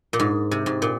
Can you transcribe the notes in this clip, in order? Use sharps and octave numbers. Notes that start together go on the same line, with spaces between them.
A#2
G#2
C3
G#2
A#2